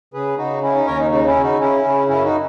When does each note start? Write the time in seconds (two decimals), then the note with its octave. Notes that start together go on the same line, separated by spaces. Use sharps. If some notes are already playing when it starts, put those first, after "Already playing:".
0.14 C#3 G#4 B4
0.37 C#3 D#4 F#4
0.63 C#4 E4
0.75 D#4
0.87 D#2 A#4 C#5
0.99 D#4
1.11 C#3 D#4
1.27 C#4 E4
1.36 C#3
1.43 D#4 F#4
1.60 C#3 C#4 E4
1.85 C#3
2.08 F#2 C#4 E4
2.24 D#4 F#4